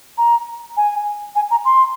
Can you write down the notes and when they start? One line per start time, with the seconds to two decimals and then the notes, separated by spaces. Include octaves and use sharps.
0.18 A#5
0.77 G#5
1.35 G#5
1.51 A#5
1.65 C6